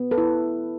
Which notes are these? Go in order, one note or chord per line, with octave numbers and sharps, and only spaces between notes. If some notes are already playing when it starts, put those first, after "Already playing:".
Already playing: B3
A4 B4
E4